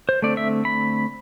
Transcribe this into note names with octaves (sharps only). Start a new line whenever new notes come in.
C5
D3 A3 C4 D5
E5
B5